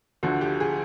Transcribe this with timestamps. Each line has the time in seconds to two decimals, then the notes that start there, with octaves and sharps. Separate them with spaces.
0.23 D2 D3 F3 F#4
0.41 G4
0.60 G#4